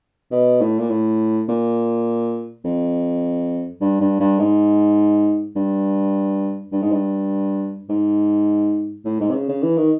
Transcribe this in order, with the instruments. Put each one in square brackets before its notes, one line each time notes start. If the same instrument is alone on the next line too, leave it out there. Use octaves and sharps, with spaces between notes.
[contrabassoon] B2
A2
A#2
A2
A#2
F2
G2
G2
G2
G#2
G2
G2
G#2
G2
G#2
A2
G#2
C3
C#3
C#3
E3
D#3